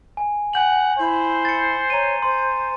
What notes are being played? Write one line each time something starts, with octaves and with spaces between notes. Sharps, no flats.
G#5
F#5 G#5 G6 F#7
E4 C5
A6 C#7
C#5 A#5 D#7
C5 C6